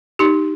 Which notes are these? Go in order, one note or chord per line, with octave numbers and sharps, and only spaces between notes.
D#4 G4